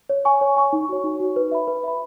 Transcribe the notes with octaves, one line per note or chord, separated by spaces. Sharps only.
C#5
G#5 C#6
C#5
G#5 C#6
D#4
F#4 C#5
D#4
F#4 C#5
B4
E5 B5
B4
E5 B5